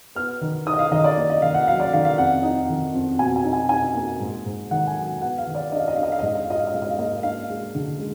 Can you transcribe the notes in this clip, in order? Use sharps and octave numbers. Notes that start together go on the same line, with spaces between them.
B3 F6
D#3
D#4 D#6
D#5
F5
D#3 D#5
D5
A#3
D#5
D#3 F5
F#5
F#3 F5
D5
D#3 F5
F5
F2 F#5
D#4
D#3
F2
B2 G#5
G#5
D#4
G#5
D#4 G#5
A#3
G#2
G#2
D#3 F#5
G#5
F#3
B3 F#5
F5
D#3
D5
D4 D#5
F5
D#5
D4 F5
D#5
F5
D#5
G#2 F5
D#5
F5
F4 D#5
F5
D#5
G#2 F5
D#5
F5
A#3 D#5
D4 F5
G#3
D3
G#3